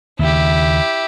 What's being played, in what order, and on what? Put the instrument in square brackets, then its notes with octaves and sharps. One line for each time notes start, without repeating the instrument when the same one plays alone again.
[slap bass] D#2 C#3 [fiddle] E4 G4